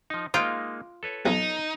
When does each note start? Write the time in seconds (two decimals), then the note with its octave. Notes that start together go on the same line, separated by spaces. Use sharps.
0.10 F3 D#4
0.34 G#3 A#3 D#4 F4 G5
1.03 A4 B4 C#5
1.26 B1 F2 D#4